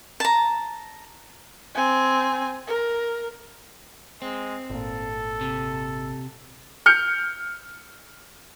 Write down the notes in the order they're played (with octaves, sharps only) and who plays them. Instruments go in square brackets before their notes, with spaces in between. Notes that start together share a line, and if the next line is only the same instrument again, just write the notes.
[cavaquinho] A5 A#5
[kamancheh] C4 G#5
A#4
[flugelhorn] G#3 [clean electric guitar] C4
[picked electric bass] G#1 A#2 [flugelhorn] A4
[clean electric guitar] C3
[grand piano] F6 G6 C#7